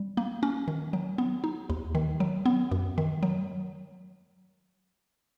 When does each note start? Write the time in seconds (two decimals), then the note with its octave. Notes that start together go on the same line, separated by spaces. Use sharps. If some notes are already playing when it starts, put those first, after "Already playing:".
Already playing: G3
0.17 A#3
0.43 C#4
0.68 D#3
0.93 F#3
1.18 B3
1.44 D#4
1.70 D#2
1.95 D#3
2.20 F#3
2.46 B3
2.71 F#2
2.98 D#3
3.23 F#3